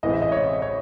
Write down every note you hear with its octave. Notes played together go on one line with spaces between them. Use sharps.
A1 A2 E3 G#3 C4 D#5
E5
D#5
C#5
C#5